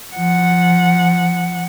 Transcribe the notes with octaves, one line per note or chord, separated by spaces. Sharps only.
F3 F#5